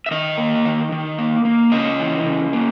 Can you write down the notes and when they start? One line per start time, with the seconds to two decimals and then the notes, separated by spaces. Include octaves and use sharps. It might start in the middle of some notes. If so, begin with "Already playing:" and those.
0.06 E5
0.11 D#3 D#5
0.38 A#3
0.65 D#3
0.92 D#3
1.18 A#3
1.45 A#3
1.72 C#3 D#5
1.99 E3
2.26 C#3
2.53 A#3